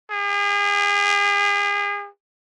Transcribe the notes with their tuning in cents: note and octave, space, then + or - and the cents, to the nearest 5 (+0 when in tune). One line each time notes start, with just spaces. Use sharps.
G#4 -40